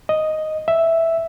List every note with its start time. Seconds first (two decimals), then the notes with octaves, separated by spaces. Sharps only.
0.09 D#5
0.68 E5